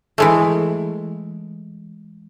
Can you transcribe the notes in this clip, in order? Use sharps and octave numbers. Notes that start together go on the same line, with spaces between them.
E3 G#3 A3